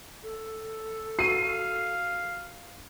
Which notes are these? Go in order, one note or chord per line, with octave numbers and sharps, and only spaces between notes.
A4
F#4 F5 C7 D#7